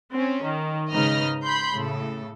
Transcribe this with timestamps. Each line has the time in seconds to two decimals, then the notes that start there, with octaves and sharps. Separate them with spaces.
0.11 C4 C#4
0.43 D#3
0.91 G#2 C#3 D#4 B4 D#5 F6
1.45 B5 C6 G6
1.74 A2 C#3 A4